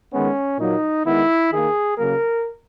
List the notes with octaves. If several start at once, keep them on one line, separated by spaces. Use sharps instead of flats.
D#3 G#3 B3 C#4
A#2 F#3 A#3 D#4
D#3 G#3 B3 E4
D#3 A#3 G#4
C#3 F#3 A#3 A#4